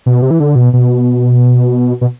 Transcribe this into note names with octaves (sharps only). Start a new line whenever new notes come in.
B2
C3
E3
D3
B2
B2
B2